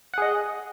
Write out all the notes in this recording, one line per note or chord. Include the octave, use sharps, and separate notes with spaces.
G#4 D#5 F#5